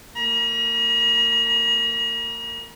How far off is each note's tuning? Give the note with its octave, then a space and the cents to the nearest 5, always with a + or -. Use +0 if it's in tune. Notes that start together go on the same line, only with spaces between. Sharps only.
A#3 -35 A#5 +45